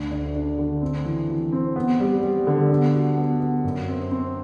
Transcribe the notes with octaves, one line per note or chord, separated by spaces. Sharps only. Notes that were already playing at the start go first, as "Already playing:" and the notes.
Already playing: D2 D4
D4
D4
D3
C4
E3
E3
C4
B3
G3
G3
D3
B3
F#4
B3
B3
F#2
C4
C4